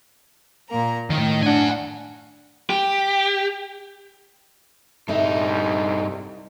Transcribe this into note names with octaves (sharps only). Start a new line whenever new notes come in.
A#2 A#3 A#5
A2 D#3
D4 F#5 G#5
G4
C2 G2 D3 D#4 E5